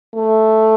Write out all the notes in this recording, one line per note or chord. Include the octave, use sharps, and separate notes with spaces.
A3